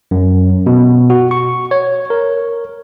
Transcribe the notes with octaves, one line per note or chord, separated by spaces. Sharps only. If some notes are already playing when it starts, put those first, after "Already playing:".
F#2
B2
F#4
C#6
C#5
A#4